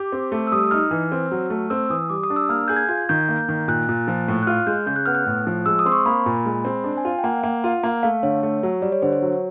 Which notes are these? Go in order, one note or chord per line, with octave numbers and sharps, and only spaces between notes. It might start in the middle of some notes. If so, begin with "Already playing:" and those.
Already playing: G4 D6
C4
A3
E6
G3 D#6
D#4 F6
E3
C4
F#3
A3
C4 E6
E3 D#6
G3 D6
D#6
D4
E6
A#3 F6
G#4 G6
G#6
F4 G#6
D#3 G6
A#3
D#3
A#2 F#6
A#2
F3
A2
F#6
F4 F6
G#3 G6
C#3 G6
F#6
B3 F6
F#6
A2
F3
G#3 E6
D#6
C4 C6
C#6
A#3 B5
A#2
G#3
C4
D4
G#5
F4
G5
A#3 F#5
A#3
F4
A#3
A3 F5
D3 C#5
A3
F#3
G3 D5
C#5
D3 C5
C#5
F#3